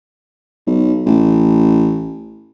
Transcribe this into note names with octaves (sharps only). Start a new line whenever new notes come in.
B1
A1